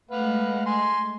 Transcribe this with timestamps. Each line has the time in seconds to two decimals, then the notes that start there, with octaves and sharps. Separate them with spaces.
0.11 G#3 A3 B4 F5 F#5
0.66 G#5 C6